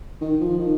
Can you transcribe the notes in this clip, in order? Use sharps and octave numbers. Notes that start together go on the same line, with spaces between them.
D#3
F3
D#3